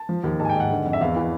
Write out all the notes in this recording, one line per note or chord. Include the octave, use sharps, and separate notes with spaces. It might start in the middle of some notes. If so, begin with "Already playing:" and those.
Already playing: A5
F3
D#2
G#2 A5
G#5
G5
G#2 F#5
D3
F2
E5
E2 F5
E3